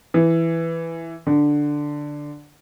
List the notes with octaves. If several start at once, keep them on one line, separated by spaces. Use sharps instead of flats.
E3
D3